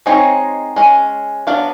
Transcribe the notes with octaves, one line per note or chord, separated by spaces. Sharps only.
G#3 C4 D#4 C#5
G#3 C#4
F#3 B3 D4 F5